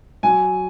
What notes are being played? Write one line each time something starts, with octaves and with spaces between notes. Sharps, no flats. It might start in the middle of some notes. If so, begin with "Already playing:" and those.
F#3 G#5